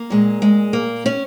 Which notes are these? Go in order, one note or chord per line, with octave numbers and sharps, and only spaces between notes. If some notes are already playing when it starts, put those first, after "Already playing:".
Already playing: A#3
A#2 G#3
G#3
A#3
C#4